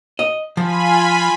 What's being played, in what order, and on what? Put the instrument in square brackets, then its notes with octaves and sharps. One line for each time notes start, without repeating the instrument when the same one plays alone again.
[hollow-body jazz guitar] D#5
[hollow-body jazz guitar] F3 [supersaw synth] F4 G#5 B5